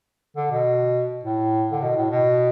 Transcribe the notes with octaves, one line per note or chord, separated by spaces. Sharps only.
D3
B2
A2
D3
B2
A2
B2